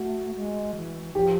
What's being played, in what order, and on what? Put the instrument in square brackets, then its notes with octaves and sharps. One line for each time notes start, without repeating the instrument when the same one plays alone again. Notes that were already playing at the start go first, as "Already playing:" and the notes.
Already playing: [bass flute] A3 [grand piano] F#4
[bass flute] G#3
E3
[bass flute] F3 [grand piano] G4